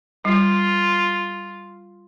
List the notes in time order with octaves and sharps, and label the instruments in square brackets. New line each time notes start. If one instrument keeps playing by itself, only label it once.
[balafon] G3 [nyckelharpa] F4